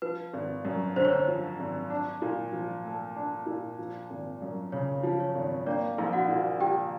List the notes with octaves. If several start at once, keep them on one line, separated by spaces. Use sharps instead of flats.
F3 B4
G#1
F#2
D3 C5
C#5
C5
F3
G#1
D4
A#2
F3
A3
D4
A#2
F3
G#1
F#2
C#3 C#5
F3
C#5
G#1
A#3 D4 D5
A#1
F#4 F#5
A#2
F3 G4 G5